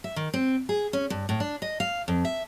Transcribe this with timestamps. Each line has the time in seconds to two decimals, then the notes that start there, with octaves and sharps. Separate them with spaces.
0.04 E5
0.16 D#3
0.34 C4
0.69 G#4
0.93 C#4
1.10 G2
1.29 A2
1.40 D4
1.62 D#5
1.80 F5
2.08 F2
2.25 E5